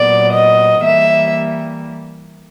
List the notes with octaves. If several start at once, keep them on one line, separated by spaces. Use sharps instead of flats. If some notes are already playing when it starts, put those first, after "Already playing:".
Already playing: A#2 F#3 B3 D5
D#5
E3 G3 A#3 E5